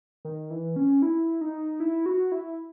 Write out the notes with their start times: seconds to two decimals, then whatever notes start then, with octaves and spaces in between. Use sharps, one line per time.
0.25 D#3
0.50 E3
0.76 C#4
1.02 E4
1.41 D#4
1.80 E4
2.06 F#4
2.32 E4